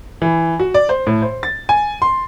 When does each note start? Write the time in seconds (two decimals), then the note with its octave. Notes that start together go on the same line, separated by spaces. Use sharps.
0.22 E3
0.59 F#4
0.74 D5
0.89 C5
1.07 A2
1.22 C5
1.43 A6
1.69 G#5
2.02 C6